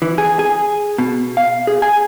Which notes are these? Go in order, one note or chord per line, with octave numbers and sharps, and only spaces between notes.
E3
G#4
G#4
B2
F5
G#4
G#5